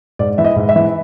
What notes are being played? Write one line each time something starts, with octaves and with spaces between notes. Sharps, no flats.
G#2 D5
E3 E5
D#5
G#2
E5
E3